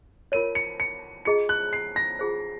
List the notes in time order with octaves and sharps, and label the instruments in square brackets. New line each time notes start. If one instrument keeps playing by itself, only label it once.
[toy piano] F4 A#4 C#5 [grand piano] D#7
[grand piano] C#7
C#7
[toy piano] F4 G#4 D#5 A#5 [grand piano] C#7
[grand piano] F#6
C7
A#6
[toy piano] F4 G#4 C5